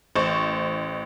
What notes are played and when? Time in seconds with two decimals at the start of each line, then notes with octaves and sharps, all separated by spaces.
0.16 A1 C5 C#6